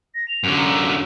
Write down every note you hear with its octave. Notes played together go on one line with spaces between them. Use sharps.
A#6
F7
F#2 D3
A#5